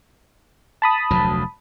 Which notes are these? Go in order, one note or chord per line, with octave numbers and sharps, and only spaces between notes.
A5 B5 D#6
F1 D2 F#3